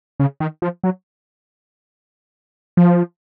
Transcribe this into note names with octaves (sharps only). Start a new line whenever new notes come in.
C#3
D#3
F3
F#3
F3